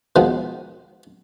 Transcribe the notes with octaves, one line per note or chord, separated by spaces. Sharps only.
B2 D#3 F3 G#3